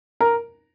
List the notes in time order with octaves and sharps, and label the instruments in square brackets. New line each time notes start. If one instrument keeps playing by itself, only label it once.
[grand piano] A#4 A#5